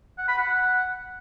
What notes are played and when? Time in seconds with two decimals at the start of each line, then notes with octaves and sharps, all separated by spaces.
0.18 F#5
0.28 B5
0.38 F#5